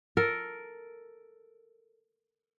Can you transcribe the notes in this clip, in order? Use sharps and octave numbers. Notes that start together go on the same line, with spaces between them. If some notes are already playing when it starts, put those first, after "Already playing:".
A4 A#4